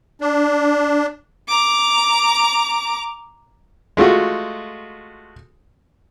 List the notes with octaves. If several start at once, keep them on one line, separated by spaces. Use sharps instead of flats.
D4
A#5 D6
G#3 A3 F4 F#4